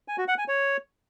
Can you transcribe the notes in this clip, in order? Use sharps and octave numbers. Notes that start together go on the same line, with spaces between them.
G#5
F#4
F#5
G#5
C#5